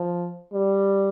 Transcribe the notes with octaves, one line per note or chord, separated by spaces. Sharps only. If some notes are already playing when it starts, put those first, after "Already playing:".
Already playing: F3
G3